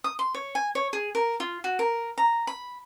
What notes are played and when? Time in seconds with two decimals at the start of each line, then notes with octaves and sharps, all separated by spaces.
0.04 D#6
0.19 C6
0.34 C#5
0.55 G#5
0.75 C#5
0.93 G#4
1.15 A#4
1.40 F4
1.64 F#4
1.79 A#4
2.18 A#5
2.47 B5